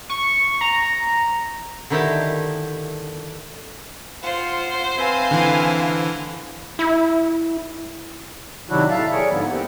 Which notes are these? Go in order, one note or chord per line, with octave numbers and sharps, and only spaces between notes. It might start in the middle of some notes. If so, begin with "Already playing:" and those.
C#6
A#5
D3 D#3 E4 G4 E5 A5
F4 C5 F#5
C4 B4 E5 F5 G#5
D3 E3
E4
C3 D#3 F#3 D4 E4 F#4
A2 E5 F5 A5
G3 G#4 A#4 C#5
G#2 D3 F3 B3 E4
A#3 C4 G4